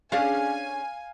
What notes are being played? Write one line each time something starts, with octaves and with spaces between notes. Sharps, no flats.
C#4 D4 G#4 F5 G#5